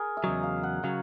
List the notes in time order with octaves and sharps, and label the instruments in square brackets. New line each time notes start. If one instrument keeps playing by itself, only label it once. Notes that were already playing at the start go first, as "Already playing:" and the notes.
Already playing: [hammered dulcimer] G#4 A#4
E5
[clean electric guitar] E2 C#3 F#3 [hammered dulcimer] D#5
[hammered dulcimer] F5
F#5
[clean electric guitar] C#3 F#3 [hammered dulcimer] F5